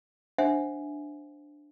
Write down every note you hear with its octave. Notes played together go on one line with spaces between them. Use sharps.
D4 C5 E5 F#5 G#5